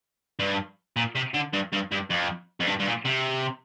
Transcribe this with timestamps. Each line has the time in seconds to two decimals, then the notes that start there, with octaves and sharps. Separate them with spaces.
0.39 G2
0.96 A#2
1.15 C3
1.34 D3
1.53 G2
1.72 G2
1.92 G2
2.10 F2
2.60 F2
2.67 G2
2.80 G2
2.87 A#2
3.06 C3